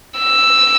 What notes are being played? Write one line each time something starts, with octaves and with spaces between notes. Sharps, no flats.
E6